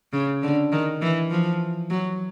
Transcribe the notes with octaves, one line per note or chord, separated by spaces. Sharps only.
C#3
D3
D#3
E3
F3
F#3